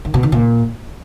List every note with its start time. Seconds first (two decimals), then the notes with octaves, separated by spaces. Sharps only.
0.05 D#3
0.14 B2
0.23 D#3
0.32 A#2